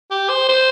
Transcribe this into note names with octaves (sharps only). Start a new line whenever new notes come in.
G4
C5
C5